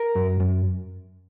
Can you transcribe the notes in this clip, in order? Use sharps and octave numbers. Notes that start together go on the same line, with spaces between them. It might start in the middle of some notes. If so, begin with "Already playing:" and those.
Already playing: A#4
F#2
F#2